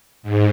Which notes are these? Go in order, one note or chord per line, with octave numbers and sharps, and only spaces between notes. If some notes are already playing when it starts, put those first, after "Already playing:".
G#2